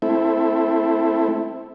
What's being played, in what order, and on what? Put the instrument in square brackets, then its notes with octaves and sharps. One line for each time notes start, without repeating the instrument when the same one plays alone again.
[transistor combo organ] A3 C4 E4